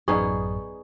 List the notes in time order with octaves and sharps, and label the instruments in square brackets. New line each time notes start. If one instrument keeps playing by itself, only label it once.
[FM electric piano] A1 F#2 [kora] B3 D#4 G#4 [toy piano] D5 C#6